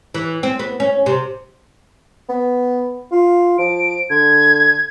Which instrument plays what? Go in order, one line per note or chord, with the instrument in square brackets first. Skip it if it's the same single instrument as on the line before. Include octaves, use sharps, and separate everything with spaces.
[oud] E3
C4
B3
C#4
C3
[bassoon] B3
F4
[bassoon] F3 [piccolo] D7
[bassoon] D3 [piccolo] G#6